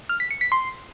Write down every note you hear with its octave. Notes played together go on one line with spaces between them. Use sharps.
F6
B6
C#7
B6
C6